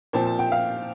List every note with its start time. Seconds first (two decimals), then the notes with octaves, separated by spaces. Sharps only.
0.13 A#2 F3 C4 A5
0.26 A5
0.39 G5
0.52 F5